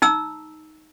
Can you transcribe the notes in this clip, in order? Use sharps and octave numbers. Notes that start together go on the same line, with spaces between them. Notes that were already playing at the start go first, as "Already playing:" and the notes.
D#4 A#5 E6